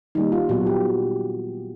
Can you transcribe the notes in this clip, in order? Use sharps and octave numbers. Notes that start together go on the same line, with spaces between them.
D#3 G3 A#3 D#4
F4
A#2 F#3 B3 F#4
G4